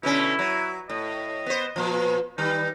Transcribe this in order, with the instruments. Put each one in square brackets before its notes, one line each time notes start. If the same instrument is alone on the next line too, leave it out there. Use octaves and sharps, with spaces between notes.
[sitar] B2 D3 C#4 [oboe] E4
[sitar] F#3
[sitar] A2 [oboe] D#5
[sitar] B3 C5
A#2 F3
[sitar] D#3 G3 [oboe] D#4